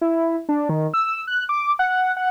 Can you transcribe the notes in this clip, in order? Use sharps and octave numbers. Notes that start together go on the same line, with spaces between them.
E4
D4
D#3
E6
F#6
D6
F#5
F#5